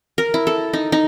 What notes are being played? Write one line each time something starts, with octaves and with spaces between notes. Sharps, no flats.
A#4
E4
A4
D#4
D#4